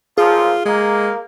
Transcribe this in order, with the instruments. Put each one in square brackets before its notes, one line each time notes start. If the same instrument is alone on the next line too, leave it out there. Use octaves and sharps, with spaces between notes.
[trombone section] B1 A#2 F3 [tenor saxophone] F4 [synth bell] G#4
[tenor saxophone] G#3 [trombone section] A#3